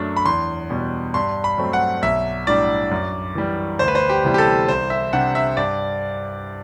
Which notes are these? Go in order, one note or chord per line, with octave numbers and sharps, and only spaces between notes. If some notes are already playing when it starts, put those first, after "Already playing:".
Already playing: F#2 F#3 A3 D4
B5
E2 C6
B2 G3
G2 C6
B5
F#3 A3 C4
F#5
B1 E5
A2 G3 D4 D5
F#2
E3 G3
D2 C5
B4
C5
G4
C3 E3 G3 B3
G4
A4
C2 C5
E5
C3 G3 D4 F#5
E5
G2 D5